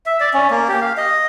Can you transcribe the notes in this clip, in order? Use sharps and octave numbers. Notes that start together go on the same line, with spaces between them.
E5
D5
C#4
A#3
G4
F5
D#5